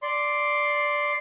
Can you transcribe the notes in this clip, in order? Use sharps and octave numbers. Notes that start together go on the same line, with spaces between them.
D5 C6